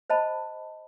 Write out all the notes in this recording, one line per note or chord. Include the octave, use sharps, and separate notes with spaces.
C5 D#5 A5 B5